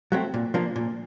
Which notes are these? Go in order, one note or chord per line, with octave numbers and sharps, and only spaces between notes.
F#3 A3 C4
A#2
F3 A#3 D4
A#2